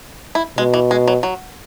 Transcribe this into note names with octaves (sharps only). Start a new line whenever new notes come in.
E4
B2 G#3
E3
G#3
F#3
F#3